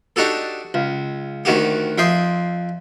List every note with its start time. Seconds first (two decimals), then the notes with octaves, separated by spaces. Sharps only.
0.16 D4 D#4 F#4 G4 A4
0.74 C#2
1.45 D2 D#3 F#4 G4
1.98 F2 E5 G5 C6 D#6